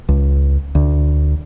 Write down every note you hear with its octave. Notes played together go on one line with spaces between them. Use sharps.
C#2
D2